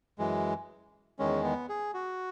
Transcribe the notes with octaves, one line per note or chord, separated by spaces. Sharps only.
F#2 E3 G#3
E2 D#3 G#3 C#4
B3
G#4
F#4